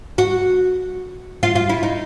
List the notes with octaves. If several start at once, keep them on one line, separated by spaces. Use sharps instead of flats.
F#4
F4
F4
E4
D#4